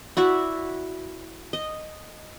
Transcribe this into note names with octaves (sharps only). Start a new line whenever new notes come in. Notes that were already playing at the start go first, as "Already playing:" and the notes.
E4 F#4 D5 E5
D#5